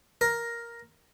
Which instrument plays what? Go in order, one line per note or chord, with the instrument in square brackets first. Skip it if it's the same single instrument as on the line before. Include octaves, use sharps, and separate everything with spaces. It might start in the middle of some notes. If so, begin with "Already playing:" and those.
[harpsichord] A#4